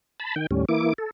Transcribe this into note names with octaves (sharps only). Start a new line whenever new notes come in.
A5 B5
D#3 G5
D#2 A2 G3 C#4
E3 A#3 E4 D6
A4